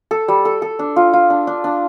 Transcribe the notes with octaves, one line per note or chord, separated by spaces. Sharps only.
A4
G3
A4
A4
D4
F4
F4
D4
D4
D4